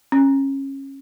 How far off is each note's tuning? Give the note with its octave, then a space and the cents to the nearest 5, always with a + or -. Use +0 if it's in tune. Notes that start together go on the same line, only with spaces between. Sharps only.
C#4 -20